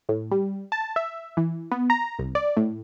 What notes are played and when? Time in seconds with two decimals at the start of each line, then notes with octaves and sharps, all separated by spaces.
0.09 A2
0.32 G3
0.72 A5
0.96 E5
1.37 E3
1.71 B3
1.90 A#5
2.19 C2
2.35 D5
2.57 A2